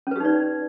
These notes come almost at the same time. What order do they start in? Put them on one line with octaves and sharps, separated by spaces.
C#4 B4 G4 D#4 D5